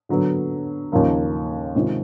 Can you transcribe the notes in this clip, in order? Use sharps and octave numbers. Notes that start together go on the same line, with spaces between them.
D3 F#3 B3
D#2 C#3 F3 A#3
C3 D#3 G#3 C4 F4